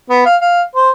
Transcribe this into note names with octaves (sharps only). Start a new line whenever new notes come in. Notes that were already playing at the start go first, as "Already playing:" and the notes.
B3
F5
F5
C5